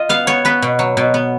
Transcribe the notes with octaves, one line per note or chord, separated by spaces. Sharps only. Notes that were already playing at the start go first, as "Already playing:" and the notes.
Already playing: F4 D#5
B3 F5
B3 C#5
B3 B4
B2
F#3
B2
B3